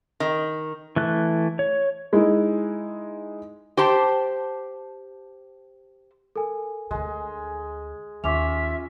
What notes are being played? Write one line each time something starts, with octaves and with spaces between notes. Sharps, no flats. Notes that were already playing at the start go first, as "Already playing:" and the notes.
D#3
E3 A3 F#6
C#5
G#3 D#4 E4
G4 C5 A5
A4 A#4 G#5
D2 D3 G#3
D#2 C#4 F4 E5 D6 F7